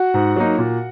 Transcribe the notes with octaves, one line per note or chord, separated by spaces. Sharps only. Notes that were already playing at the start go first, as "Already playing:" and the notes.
Already playing: F#4 F#5
G#2
F#3 A#3 D#4
A#2